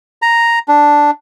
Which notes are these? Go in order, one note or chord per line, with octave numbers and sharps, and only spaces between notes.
A#5
D4